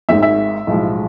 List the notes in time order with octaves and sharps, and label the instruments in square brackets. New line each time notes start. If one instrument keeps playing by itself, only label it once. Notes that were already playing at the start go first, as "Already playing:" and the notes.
[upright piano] G#1 G#2 D#3 E5
E5
B1 A2 F3 G#3